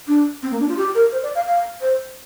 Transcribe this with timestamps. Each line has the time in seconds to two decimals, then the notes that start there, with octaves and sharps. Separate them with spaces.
0.08 D4
0.43 C4
0.51 A#3
0.60 D4
0.69 F4
0.77 G4
0.95 A#4
1.12 C5
1.23 D5
1.35 F5
1.46 F5
1.81 C5